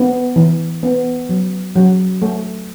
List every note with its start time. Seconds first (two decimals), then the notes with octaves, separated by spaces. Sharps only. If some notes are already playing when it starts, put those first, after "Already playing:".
Already playing: B3
0.36 E3
0.83 B3
1.29 F#3
1.76 F#3
2.22 A3